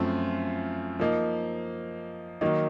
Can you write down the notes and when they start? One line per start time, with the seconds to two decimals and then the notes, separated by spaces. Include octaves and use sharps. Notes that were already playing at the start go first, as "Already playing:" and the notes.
Already playing: F#2 F3 A3 C4 F4
1.00 F3 A#3 D#4
2.41 D#3 F#3 A#3 D#4